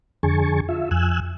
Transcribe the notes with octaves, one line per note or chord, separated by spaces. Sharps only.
F2 D3 G#4 G#5 A5 C#6
F4 E5
F2 G#5 E6 F#6